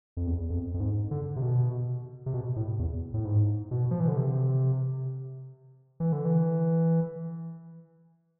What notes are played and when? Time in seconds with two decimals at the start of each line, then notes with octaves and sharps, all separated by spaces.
0.17 F2
0.27 E2
0.50 F2
0.74 F2
0.80 G#2
1.11 D3
1.36 C3
1.42 B2
2.26 C3
2.34 B2
2.56 A2
2.79 E2
3.14 A2
3.25 G#2
3.71 B2
3.91 F3
4.00 E3
4.08 D3
4.17 C3
6.00 E3
6.12 D3
6.25 E3